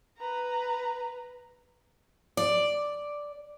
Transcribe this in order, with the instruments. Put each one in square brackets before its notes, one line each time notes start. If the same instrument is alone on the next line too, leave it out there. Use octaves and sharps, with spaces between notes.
[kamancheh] B4 A#5
[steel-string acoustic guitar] D5